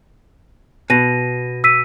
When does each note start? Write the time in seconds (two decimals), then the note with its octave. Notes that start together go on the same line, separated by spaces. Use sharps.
0.90 B2 A#6 D#7
1.64 E6 B6 D#7